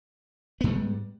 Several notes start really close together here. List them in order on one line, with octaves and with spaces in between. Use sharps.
B3 G#2 G3